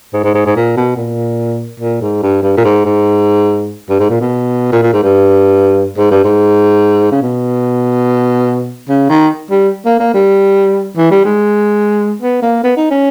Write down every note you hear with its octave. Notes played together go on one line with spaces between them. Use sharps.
G#2
G#2
G#2
G#2
A#2
B2
A#2
A#2
G#2
G2
G2
A#2
G#2
G#2
G2
G#2
A#2
B2
A#2
A#2
G#2
G2
G#2
G2
G#2
C#3
B2
C#3
D#3
G3
A#3
A#3
G3
E3
G3
G#3
B3
A#3
B3
D#4
C#4